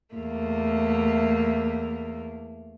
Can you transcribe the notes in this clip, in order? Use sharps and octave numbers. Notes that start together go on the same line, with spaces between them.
E2 A3 A#3